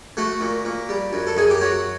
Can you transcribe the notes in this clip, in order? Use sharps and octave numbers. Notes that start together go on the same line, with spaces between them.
A3 F#4
A#2
A#2
G3
F#2
A4
F#2 G#4
G4
F#3 F#4